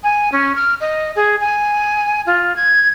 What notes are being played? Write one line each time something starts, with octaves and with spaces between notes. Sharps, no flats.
G#5
C#4
F6
D#5
G#4
G#5
F4
G#6